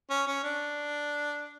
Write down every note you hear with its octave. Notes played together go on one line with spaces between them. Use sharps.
C#4
C#4
D4